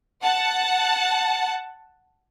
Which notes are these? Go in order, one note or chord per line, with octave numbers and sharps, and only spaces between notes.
F#5 A5